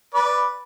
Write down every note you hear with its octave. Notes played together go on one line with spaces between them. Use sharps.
B4 D5